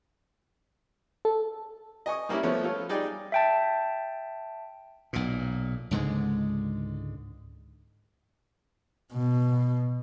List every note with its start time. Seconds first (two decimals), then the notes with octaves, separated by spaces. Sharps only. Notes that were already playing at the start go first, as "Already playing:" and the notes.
1.25 A4
2.06 D#5 G#5 C#6 D#6
2.29 G3 A#3 C#4 E4
2.43 F3 A3 B3 C#5
2.63 F4 A4 C#5
2.89 G3 D#4 G#4 D5 G5
3.32 E5 G5 A5
5.13 B1 A#2
5.91 C#2 G#2 D3 G#3
9.13 B2